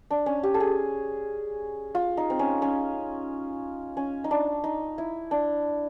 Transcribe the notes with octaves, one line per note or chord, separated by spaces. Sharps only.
D4
C#4
G4
A4
G#4
F4
D#4
C4
C#4
C#4
C#4
D#4
D4
D#4
E4
D4